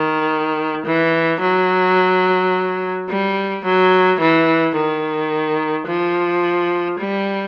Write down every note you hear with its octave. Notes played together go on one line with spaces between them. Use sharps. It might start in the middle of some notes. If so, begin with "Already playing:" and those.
Already playing: D#3
E3
F#3
G3
F#3
E3
D#3
F3
G3